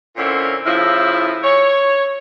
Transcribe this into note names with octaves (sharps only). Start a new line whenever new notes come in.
A#2 D3 C4 C#4 E4
A2 C#3 F3 E4
C#5